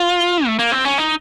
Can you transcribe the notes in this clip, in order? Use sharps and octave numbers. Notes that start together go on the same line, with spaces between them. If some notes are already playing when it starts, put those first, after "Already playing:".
Already playing: F4
A3
A#3
C4
C#4
D#4